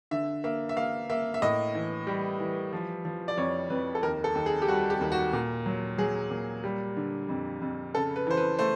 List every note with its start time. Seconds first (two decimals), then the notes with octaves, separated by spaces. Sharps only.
0.11 D3 E5
0.44 A#3 E5
0.69 E5
0.76 A#3 F5
1.09 A#3 E5
1.34 E5
1.42 A2 D#5
1.75 E3
2.07 G3
2.40 E3
2.73 F3
3.05 F3
3.28 D5
3.37 F2 C#5
3.70 F2 B4
3.95 A4
4.03 D#2 A#4
4.24 A4
4.35 D#2
4.46 G#4
4.62 G4
4.68 G3 F#4
4.90 G4
5.01 D#2
5.12 F#4
5.33 A#2
5.66 F#3
5.98 F#3 G#4
6.31 A#2
6.64 G3
6.97 D3
7.29 F2
7.61 F2
7.94 C#3 A4
8.16 B4
8.27 E3 C5
8.37 B4
8.59 A3 C5